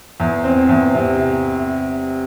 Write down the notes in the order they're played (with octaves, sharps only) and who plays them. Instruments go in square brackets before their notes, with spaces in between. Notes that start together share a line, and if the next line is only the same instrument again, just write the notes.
[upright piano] E2
C4
E2
C3